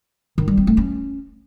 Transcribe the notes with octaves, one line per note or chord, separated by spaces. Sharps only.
D#3
G3
C4
A3
C#4